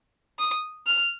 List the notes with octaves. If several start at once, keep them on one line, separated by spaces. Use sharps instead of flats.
D#6
F6